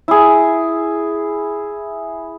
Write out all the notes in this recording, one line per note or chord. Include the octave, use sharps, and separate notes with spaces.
E4 G#4